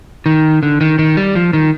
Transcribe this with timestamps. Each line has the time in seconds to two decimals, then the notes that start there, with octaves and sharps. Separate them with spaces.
0.26 D#3
0.63 D3
0.81 D#3
0.99 D#3
1.17 G3
1.35 F3
1.53 D#3